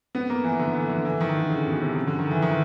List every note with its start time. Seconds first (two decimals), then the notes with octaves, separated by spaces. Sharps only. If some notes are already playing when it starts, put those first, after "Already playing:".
0.15 B3
0.30 A#3
0.44 E3
0.59 D3
0.75 E3
0.89 D3
1.05 E3
1.21 D#3
1.35 D3
1.50 C#3
1.66 B2
1.81 C3
1.96 C#3
2.07 D3
2.19 D#3
2.31 E3
2.42 D#3